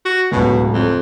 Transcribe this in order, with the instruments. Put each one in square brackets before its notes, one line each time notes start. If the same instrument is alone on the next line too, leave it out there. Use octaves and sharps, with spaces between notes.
[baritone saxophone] F#4
[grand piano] D1 C#2 [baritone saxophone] B2
[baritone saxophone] F2